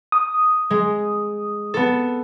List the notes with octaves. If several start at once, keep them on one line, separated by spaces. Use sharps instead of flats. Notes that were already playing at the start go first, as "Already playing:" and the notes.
D#6
G#3
B3 A4